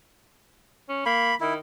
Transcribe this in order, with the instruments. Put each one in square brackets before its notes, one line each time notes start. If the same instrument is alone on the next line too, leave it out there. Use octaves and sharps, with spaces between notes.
[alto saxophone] C#4
[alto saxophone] A#3 [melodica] B5
[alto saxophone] D#3 [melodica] E4